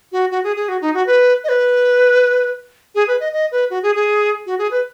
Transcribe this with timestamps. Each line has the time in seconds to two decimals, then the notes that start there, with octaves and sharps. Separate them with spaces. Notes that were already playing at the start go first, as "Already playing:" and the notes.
0.12 F#4
0.31 F#4
0.44 G#4
0.56 G#4
0.68 F#4
0.81 D#4
0.94 F#4
1.07 B4
1.44 D#5
1.49 B4
2.95 G#4
3.08 B4
3.20 D#5
3.33 D#5
3.52 B4
3.70 F#4
3.83 G#4
3.95 G#4
4.46 F#4
4.59 G#4
4.71 B4